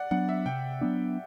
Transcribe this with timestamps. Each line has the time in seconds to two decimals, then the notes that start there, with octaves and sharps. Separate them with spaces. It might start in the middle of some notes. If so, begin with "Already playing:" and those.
Already playing: D5 F#5
0.11 F#3 B3 D4 F#5
0.29 E5
0.46 C3 G5
0.81 F#3 B3 D4